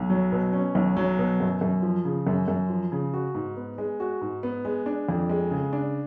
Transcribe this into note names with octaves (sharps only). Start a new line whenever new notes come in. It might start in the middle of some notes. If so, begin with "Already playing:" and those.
Already playing: B1
F#3
B2
C#4
B1
F#3
B2
F#2
F#2
F3
C#3
F#2
F#2
F3
C#3
F#4
G#2
B3
G#3
F#4
G#2
B3
G#3
D4
F2
G#3
C#3
D4